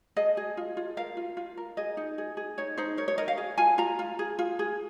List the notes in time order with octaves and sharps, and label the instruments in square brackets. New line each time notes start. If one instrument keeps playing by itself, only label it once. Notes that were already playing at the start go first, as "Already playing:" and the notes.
[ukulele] G#4 D#5
G#4
F4
F4
A#4 F5
F4
F4
A#4
G#4 D#5
D#4
G#4
G#4
D#4 C#5
D#4 C5
A#4 C#5
C#5
A#4 D#5
F5
G#4
F4 G#5
F4 A#5
F4
G#4
F4
G#4